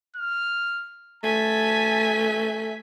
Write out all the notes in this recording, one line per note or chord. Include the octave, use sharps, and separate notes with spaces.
F6
A3 G#5 A5 B6